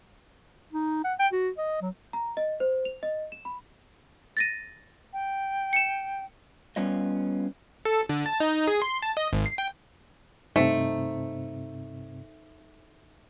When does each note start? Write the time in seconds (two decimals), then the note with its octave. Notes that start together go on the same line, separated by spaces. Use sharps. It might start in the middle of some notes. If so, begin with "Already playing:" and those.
0.73 D#4
1.04 F#5
1.19 G5
1.33 F#4
1.58 D#5
1.81 F#3
2.13 A#5
2.37 D#5
2.60 C5
2.85 F7
3.03 D#5
3.32 E7
3.45 B5
4.37 A6 A#6 D#7
5.13 G5
5.73 C#7 E7
6.76 G3 B3 C#4 F4 D#5
7.85 A4
8.09 D3
8.26 A5
8.40 D#4
8.68 G#4
8.82 C6
9.02 A5
9.17 D#5
9.33 G#1
9.46 C7
9.58 G5
10.56 G2 C3 A3 C4 D#4 C5